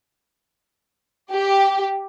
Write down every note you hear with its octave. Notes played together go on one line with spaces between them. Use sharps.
G4